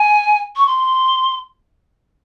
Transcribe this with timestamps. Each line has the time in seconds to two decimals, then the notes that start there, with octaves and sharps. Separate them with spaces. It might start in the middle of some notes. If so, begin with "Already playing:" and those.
Already playing: G#5
0.56 C#6
0.67 C6